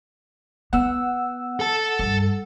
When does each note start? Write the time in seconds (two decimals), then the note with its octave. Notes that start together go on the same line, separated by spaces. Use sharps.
0.73 B3 F#5 E6
1.60 A4 A5
1.99 G2